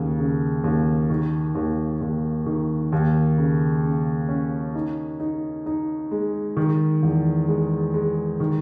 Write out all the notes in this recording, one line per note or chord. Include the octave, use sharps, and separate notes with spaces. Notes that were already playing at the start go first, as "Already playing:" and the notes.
Already playing: D#2 C#3
C#3
D#2
D#3
D#2
D#2
D#3
D#2
C#3
C#3
C#4
D#4
D#4
D#4
G#3
D#3
E2
G#3
G#3
D#3